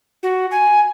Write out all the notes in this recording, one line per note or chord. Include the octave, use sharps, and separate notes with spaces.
F#4
G#5